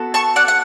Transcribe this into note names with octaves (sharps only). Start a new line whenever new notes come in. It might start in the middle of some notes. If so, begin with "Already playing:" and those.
Already playing: B3 F#4 A4
A5 C#6
D5 F#5
F#5